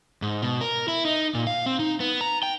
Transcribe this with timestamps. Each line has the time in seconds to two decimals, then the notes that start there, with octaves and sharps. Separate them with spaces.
0.22 G#2
0.42 B2
0.61 A#4
0.88 E4
1.05 D#4
1.35 A#2
1.47 F5
1.66 C4
1.80 D#4
2.00 B3
2.21 A#5
2.43 G5